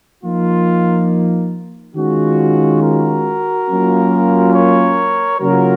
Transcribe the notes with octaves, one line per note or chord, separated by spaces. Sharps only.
F3 A#3 D#4 F4
D#3 G#3 C#4 F4 F#4
F#4 A#4
F#3 A#3 C#4 F4
A#4 C#5
C#3 F#3 A#3 F4 F#4 A#4